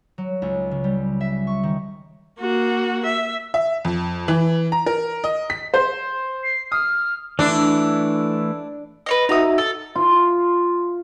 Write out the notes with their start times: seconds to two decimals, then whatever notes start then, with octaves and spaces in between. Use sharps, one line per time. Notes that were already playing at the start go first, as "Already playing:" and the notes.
0.18 F#3
0.42 C#2
0.71 C#3
0.84 G3
1.21 E5
1.47 C#6
1.63 D#3
2.40 A#3 F#4
3.05 E5
3.54 E5
3.85 F2
4.28 E3
4.72 A#5
4.86 A#4
5.24 D#5
5.50 B6
5.74 C5
6.44 C7
6.72 D#6 F6
7.39 E3 A3 D4 E4
9.06 B4 C#5 D#5
9.29 D#4 F#4 E5 A#5 D#6
9.58 A4
9.95 F4